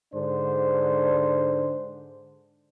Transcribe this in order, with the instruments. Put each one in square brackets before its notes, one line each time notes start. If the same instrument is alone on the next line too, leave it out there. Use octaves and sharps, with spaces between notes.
[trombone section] G#2 D3 D4 C5